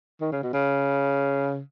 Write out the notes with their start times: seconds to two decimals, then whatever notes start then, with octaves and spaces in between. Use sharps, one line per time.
0.21 D#3
0.32 C#3
0.43 B2
0.53 C#3